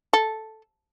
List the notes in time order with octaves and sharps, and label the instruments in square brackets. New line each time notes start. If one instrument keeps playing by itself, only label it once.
[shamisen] A4